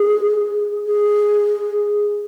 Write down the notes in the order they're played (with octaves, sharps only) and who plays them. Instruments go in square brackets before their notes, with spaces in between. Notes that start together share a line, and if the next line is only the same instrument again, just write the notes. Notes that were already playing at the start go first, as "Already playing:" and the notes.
Already playing: [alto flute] G#4
G#4